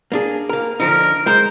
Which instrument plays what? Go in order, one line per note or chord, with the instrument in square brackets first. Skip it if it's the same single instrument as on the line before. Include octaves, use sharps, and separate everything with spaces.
[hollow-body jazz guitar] A#3 D4 G#4
A#3 A#4
[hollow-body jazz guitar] D3 F3 D#4 [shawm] A#4
[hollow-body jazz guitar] G#3 A#4 [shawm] C5